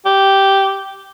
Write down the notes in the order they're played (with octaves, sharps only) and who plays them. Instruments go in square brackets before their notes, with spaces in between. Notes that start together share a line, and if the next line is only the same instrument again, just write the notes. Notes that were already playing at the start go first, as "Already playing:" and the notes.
[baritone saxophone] G4